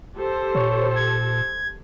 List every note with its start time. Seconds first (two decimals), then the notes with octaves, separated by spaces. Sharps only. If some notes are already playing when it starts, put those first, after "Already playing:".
0.17 G4 A4 C5
0.55 A#2 C#5
0.96 G#6